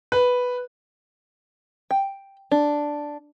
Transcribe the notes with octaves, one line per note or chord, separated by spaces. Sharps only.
B4
G5
D4